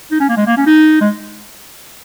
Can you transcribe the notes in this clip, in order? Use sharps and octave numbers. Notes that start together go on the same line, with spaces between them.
D#4
C#4
A#3
G#3
A#3
C#4
D#4
G#3